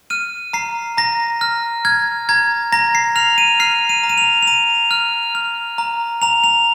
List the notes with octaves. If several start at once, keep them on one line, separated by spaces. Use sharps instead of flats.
F6 D#7
A#5 C7
A#5 A#6
F6
F6 G#6
A#5 G#6
A#5 A#6
C7
F6 F7
D#7
F6 C7
D#7
A#5
D#7
F7
F7
A#5 D#7
F6
F6
A#5
A#5 F7
F7